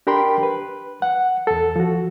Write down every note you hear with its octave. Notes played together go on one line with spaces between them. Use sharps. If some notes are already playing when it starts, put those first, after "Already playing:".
D4 G4 A#4 G5 B5 C6
B4
F#5
E2 A4
F3 F#4